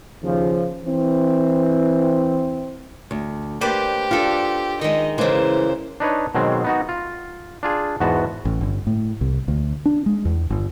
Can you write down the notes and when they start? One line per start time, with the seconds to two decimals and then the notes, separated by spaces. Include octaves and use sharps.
0.22 D#2 C#3 F3
0.84 E3 C4
3.11 D2
3.61 A#3 G4 B4 C5 D5
4.11 D4 F4 A4
4.81 D#3 G#3 D#5
5.18 C#3 E3 G#3 A#3 C5
6.00 D4 D#4 B4 C#5
6.35 B2 D#3 F#3 G#3 C4
6.64 B3 D#4 F#4
6.89 F4
7.63 D4 F4 G#4
8.00 E2 G#2 B3 F#4 A5
8.45 A1
8.61 G1
8.87 A2
9.21 C2
9.48 D2
9.85 D4
10.06 G#3
10.25 E2
10.50 G1